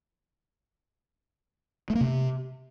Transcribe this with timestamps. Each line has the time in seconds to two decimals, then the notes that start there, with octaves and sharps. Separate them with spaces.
1.90 A3
1.95 A#3
2.01 C3